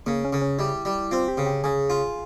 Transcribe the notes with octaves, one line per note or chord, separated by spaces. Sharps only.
C#3 A#3
C#4
C#3
C#4
G3 E4
G3
C4 F4
G4
C#3
G4
C#3 G#4
F4